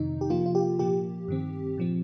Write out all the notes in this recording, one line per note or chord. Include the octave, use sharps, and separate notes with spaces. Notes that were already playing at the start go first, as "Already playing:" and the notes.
Already playing: F2 C3 D#3 D#4
G4
C3 F3 A#3 F4
F4
G4
A#2 F3 A#3 G4
G2 D#3 C4
A#2 F3 C4